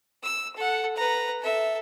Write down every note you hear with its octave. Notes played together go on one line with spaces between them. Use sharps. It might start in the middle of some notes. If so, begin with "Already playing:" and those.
E6
A4 F#5
B4 A#5
A4 E5